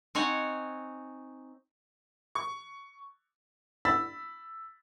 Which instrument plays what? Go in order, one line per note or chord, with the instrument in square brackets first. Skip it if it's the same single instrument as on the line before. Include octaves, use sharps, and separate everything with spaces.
[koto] C4 D#4 C#5 F#5 G#5
[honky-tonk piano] C#6
[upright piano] B5 E6 A6 B6